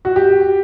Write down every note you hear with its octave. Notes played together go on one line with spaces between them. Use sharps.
F#4
G4